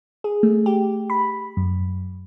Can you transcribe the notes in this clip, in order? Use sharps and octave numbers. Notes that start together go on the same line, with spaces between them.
G#4
A3
G4
B5
F#2